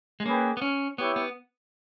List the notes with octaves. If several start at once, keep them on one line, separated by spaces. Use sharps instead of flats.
G#3
A#3 C#4 G#4 B4 G5
B3
C#4
B3 E4 G4 C#5
B3